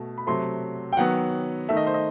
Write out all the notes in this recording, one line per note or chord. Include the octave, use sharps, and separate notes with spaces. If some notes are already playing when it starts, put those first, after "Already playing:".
Already playing: B2 A3
B5
C3 F#3 A3 C6
G5
D#3 F#3 B3 F#5
D#3 A3 E5
D#5
C5
D#5